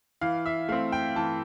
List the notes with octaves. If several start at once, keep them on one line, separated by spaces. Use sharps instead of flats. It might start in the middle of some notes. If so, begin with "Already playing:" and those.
E3 F5
E5
A3 C4 F5
G5
E3 A5